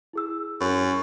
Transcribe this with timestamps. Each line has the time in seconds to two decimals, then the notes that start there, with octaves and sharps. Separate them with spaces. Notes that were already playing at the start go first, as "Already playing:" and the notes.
0.13 E4 G#4 E6
0.61 F#2